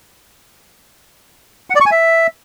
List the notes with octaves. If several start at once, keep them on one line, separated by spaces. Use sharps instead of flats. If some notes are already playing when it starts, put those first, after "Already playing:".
F#5
D5
C#6
G#5
E5